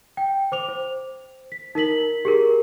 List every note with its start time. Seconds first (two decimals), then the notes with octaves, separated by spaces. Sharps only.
0.17 G5
0.52 C5 D6 F7
0.68 C5
1.52 B6
1.75 D#4 A#4 B6 F#7
2.25 G4 G#4 A#4